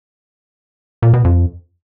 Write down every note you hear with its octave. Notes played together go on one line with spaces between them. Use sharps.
A#2
B2
F2